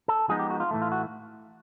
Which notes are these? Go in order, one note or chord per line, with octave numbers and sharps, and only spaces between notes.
A4
F3 G#3 B3 D#4 G#4
G4
F#4
F4
A2 E3 A3
F4
F#4